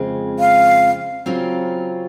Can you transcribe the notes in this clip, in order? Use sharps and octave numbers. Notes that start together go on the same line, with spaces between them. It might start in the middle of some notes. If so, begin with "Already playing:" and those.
Already playing: F2 C#3 F3 G#3 C4
F5
C#3 F#3 C4 F4